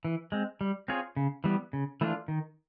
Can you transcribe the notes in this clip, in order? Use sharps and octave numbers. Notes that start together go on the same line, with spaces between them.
E3
G#3 C4
G3
C4 F4 G#4 C#5
C#3
E3 G3 B3
C#3
E3 A3 D4 F4
D#3